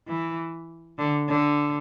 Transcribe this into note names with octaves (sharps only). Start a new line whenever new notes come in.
E3
D3
D3